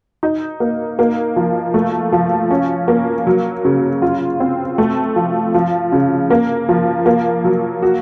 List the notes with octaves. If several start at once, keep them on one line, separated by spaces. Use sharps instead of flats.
D#4
A#3
A#3
F3
A3
F3
C#4
A#3
F#3
C#3
F4
C4
A3
F3
F3
C#3
A#3
F3
A#3
F#3
F#4